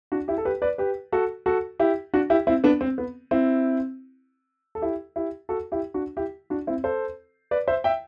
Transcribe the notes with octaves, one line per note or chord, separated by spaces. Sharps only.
D4 F#4
E4 G4
A4
G4 B4
B4 D5
G4 B4
F#4 A4
F#4 A4
E4 G4
D4 F#4
E4 G4
C4 E4
B3 D4
C4
B3
C4 E4
A4
E4 G4
E4 G4
F#4 A4
E4 G4
D4 F#4
E4 G4
D4 F#4
C4 E4
A4 C5
B4 D5
C5 E5
E5 G5